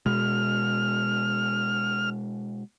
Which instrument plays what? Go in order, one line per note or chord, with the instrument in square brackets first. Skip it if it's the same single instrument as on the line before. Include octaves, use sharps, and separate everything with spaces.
[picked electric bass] B2 G#3 [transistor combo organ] F6